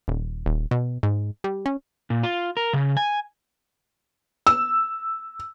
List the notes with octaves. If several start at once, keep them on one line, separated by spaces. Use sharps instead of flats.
D#1
D#1
B2
G#2
G3
C#4
A#2
F4
A#4
C#3
G#5
E6